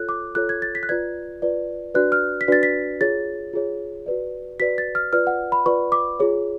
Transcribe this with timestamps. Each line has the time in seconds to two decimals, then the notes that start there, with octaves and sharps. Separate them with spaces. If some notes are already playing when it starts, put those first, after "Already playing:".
Already playing: F4 A4 C#5 F#6
0.09 D6
0.35 F4 A4 C#5 F#6
0.49 G#6
0.62 A6
0.75 B6
0.83 F#6
0.89 F4 B4 D5 G#6
1.42 F4 B4 D5
1.94 D4 F#4 B4 D5 F#6
2.12 F6
2.41 B6
2.48 D4 F#4 B4 D5 A6
2.63 B6
3.01 F4 G#4 C#5 A6
3.53 F4 G#4 C#5
4.06 F#4 B4 D5
4.59 F#4 B4 D5 B6
4.78 A6
4.95 F6
5.13 F4 B4 D5 F6
5.27 F#5
5.52 B5
5.66 F4 B4 D5 C#6
5.92 D6
6.19 F4 G#4 C#5